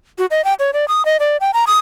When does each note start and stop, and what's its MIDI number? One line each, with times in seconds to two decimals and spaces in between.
0.18 0.26 66
0.31 0.44 75
0.45 0.54 79
0.59 0.71 73
0.73 0.88 74
0.88 1.05 87
1.05 1.17 75
1.20 1.37 74
1.41 1.51 79
1.54 1.65 82
1.67 1.78 87